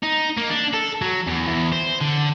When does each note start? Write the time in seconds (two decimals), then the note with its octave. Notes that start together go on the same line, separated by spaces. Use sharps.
0.03 D#4
0.37 A#3
0.50 D4
0.73 A4
1.02 F#3
1.28 E2
1.48 E2
1.72 C5
2.01 D3